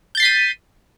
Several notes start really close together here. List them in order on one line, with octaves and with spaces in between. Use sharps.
G6 A6 C7 B6 D#7